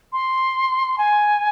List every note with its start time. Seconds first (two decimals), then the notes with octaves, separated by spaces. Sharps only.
0.12 C6
0.98 G#5